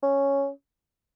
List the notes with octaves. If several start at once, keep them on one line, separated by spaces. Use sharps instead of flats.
C#4